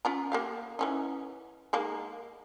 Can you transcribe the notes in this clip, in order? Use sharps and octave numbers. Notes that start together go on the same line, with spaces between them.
C#4 F4 A#5
A#3 G4 F5
E3 C#4 D#4
D#3 G#3 A#3